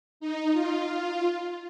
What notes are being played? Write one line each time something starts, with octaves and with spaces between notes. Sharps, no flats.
D#4
F4